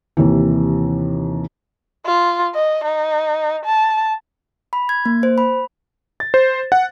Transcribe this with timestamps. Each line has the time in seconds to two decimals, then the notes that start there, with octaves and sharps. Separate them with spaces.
0.17 D#2 C3 E3
2.06 F4
2.55 D#5
2.84 D#4
3.65 A5
4.73 B5
4.89 G#6
5.06 A#3
5.23 C5
5.38 B5
6.20 A6
6.34 C5
6.72 F#5